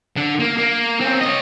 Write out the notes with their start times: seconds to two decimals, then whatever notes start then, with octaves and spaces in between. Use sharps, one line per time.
0.16 D3
0.40 A#3
0.57 A#3
1.01 C4 C#4
1.21 C#5 D#5